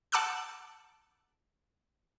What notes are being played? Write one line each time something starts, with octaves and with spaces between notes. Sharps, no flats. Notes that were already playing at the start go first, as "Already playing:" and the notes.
F#5 A5 D6 E6 F#6 G6